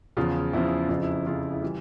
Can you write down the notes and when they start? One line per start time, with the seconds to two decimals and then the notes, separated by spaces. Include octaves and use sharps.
0.17 E2 C#3 F3 F4
0.53 E2 C#3 F3 E4
0.89 F2 C#3 F3 F4
1.02 E4
1.14 F4
1.26 F2 C#3 F3 F4
1.54 E4
1.62 E3 G3 F4